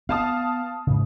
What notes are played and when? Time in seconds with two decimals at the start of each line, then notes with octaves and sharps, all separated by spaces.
0.09 B3 F5 A5 D#6
0.87 G#2 C#3